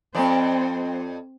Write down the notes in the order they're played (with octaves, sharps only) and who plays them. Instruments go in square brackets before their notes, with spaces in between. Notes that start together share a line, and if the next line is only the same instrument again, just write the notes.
[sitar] F2 D5 [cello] C4